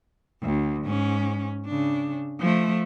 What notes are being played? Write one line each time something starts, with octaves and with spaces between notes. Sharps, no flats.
D2
G#2 C#4
C#3 D4
F3 A3